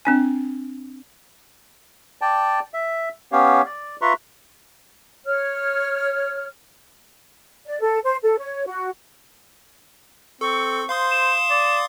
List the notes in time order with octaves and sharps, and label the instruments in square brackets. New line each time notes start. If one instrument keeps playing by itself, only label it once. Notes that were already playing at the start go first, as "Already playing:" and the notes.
[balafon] C4 D4 G#5
[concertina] D5 G5 A5
E5
B3 C#4 G4 C#5 F5
D5
F4 B4 E5 A#5 C6 C#6
[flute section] C#5 F6
D5
A4
C5
A4
C#5
F#4
[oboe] C4 [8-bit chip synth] A4 [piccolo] C#6
[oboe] C5 [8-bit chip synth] F5 C6 D#6
[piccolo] E7
[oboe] D5